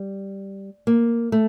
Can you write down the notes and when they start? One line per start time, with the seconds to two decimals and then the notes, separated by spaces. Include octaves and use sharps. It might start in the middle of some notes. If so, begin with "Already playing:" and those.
Already playing: G3
0.87 A#3
1.32 A3